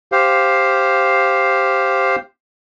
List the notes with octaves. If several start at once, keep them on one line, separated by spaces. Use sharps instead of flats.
G4 C5 F5